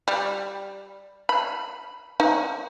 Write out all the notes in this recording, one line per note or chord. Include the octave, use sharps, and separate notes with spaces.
G3
B5
D#4